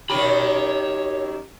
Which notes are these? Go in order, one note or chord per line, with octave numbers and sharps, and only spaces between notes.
F#2 D#3 G4 C#5 B5